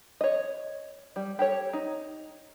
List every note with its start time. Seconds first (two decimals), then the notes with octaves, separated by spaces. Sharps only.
0.21 C#5 D#5
1.16 G3
1.39 G4 A4 C#5
1.73 D#4